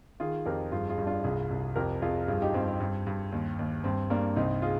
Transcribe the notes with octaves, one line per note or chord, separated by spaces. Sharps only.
D#3 F4 G#4
F2 G4 A#4
G2 F4 G#4
F4 G#4
G2
D4 F4
C2 F4 G#4
C2
F2 G4 A#4
F2 F4 G#4
G2 F4 G#4
D#4 G4
G2 C4
C4
G2
G2
D#2
D#2
G2 C4
G2 A#3 D4
C2 C4 D#4
F4 G#4